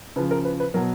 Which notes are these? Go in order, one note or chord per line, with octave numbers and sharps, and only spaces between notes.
C#3 F3 B4
A#4
B4
B4
B2 F#3 A#4